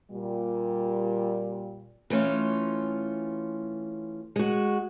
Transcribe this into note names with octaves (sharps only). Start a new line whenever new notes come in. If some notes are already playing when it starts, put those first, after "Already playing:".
A#2 G3
E3 A3 C#4 F4
G#3 F#4